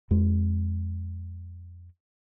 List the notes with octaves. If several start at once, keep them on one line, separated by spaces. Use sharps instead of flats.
F2 G#3